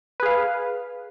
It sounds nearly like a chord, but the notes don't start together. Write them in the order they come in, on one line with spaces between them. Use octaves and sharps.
B4 G#4 F5